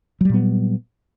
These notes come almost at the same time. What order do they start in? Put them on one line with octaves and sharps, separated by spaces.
F#3 G3 A#2 B3